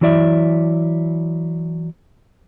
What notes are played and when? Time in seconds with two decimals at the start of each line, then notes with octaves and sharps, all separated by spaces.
0.01 E3 F#3 E4 D5 E5